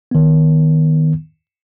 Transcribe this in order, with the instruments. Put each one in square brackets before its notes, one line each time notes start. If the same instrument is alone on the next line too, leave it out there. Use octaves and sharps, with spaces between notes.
[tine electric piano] D#3 B3